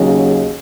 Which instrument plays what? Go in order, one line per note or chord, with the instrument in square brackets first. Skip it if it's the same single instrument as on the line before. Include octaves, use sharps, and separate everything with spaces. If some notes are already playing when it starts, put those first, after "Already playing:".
Already playing: [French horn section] D#2 C#3 F#3